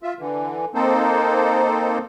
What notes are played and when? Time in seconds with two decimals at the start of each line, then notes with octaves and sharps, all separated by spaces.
0.03 F4 E5
0.19 D3 E3
0.75 A#3 C4 D#4 A4 C5